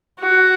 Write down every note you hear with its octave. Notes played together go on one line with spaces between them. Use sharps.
F#4